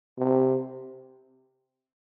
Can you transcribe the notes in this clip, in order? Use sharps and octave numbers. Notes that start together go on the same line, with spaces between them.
C3